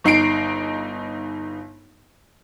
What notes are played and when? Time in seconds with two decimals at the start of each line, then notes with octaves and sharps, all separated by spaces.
0.04 G1 D#4 C7 D7